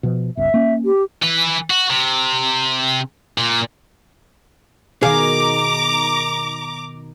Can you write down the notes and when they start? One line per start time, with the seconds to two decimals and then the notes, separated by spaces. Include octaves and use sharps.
0.03 B2 F3
0.37 G1 C#2 E5
0.54 A#3 C#4
0.85 G4
1.22 E3 B4
1.70 F#4
1.90 C3
3.38 A#2
5.02 B2 D#3 G#4 F5 A#5 D6